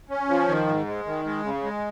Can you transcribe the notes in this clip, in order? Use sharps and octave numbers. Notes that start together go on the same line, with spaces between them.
C#4
F3
D#3
G#2
G#3
D#3
G#3
C#3
G#3